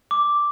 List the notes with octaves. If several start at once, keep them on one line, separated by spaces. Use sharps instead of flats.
D6